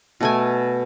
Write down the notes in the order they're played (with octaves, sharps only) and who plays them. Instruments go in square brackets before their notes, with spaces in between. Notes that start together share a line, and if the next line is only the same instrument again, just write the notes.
[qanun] B2 A3 G#5